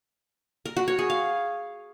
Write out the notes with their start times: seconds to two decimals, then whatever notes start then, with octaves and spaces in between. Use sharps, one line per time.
0.65 A#4
0.77 F#4
0.88 C#5
0.99 G#4
1.10 F5